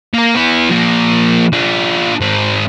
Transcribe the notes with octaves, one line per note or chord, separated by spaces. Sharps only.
A#3 A#4
B3 E4
F3 A#3
D4 F4
G#2 C4